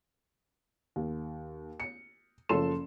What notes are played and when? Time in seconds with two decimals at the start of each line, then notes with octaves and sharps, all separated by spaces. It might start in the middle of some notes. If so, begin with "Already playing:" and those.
0.96 D#2
1.80 C#7
2.49 F#1 F3 A4 C6 E7